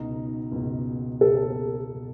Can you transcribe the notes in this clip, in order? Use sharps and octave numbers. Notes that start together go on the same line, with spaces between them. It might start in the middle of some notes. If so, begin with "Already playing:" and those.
Already playing: C#2 B2 D#4
C#2 B2
C#2 B2 A4
B2